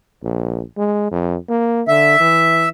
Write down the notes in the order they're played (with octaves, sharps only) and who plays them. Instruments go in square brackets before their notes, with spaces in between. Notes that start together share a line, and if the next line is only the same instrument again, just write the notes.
[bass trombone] A#1
G#3
F2
A#3
[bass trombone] D3 [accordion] E5
[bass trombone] E3